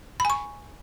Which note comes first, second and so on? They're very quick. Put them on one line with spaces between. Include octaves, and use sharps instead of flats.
B5 G#5 C#6